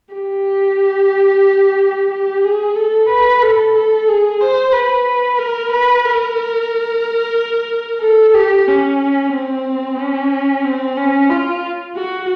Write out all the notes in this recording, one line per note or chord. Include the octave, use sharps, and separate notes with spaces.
G4
G4
G#4
A4
B4
A4
A4
G#4
C5
B4
A#4
B4
A#4
A4
G4
C#4
C4
C#4
C4
C#4
F4
F#4